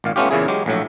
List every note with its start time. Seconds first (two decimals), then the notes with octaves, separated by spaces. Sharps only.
0.04 G#1 A#2 F5
0.16 A3 B3 C#4 F4 G4
0.31 E2 A#2 C#3 E4 G#4
0.48 F#3 G#3 G4
0.66 A#1 A2 F#3